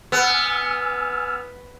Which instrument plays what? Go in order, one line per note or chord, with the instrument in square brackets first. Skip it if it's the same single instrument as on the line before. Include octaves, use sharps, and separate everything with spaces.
[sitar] B3 [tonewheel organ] G#5 E6 F6